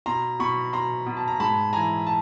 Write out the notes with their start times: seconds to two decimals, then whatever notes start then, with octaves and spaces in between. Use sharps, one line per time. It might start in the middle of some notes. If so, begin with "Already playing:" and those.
0.06 B2 A#5 C6
0.39 B2 B5 C#6
0.73 B2 A#5 C6
1.06 B2
1.17 A5
1.28 A#5
1.40 G#2 A5 B5
1.73 E3 G#5 A#5
2.06 A5